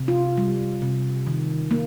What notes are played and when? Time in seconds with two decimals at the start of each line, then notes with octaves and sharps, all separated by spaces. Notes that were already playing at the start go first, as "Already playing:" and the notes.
Already playing: C3
0.08 F4
0.38 G3
0.82 C3
1.27 D#3
1.71 A#3